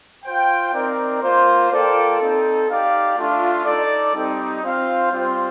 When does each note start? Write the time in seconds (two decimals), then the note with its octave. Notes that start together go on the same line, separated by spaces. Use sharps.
0.25 F4 C5 G5
0.73 C4 D#4 A#4 D5
1.22 A#3 F4 C5
1.70 A#3 F4 A4 D5 G5
2.18 C4 D#4 A4
2.68 D#4 G4 D5 F5
3.16 A3 D4 F4
3.65 D#4 A4 D5
4.13 G3 C4 D#4
4.62 C4 F4 C5 F5
5.11 G3 C4 F4 C5